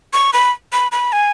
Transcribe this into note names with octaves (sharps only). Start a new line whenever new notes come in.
C#6
B5
B5
B5
G#5